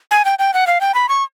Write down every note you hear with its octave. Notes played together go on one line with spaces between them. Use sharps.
G#5
G5
G5
F#5
F5
G5
B5
C#6